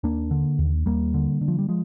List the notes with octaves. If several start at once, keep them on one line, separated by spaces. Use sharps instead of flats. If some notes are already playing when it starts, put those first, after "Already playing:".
D#2 A#3 D4
D3
D#2
D#2 G3 A#3
D3
D3
F3
G3
F3 G#3